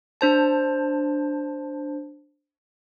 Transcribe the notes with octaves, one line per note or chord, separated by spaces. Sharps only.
D4 C5 A5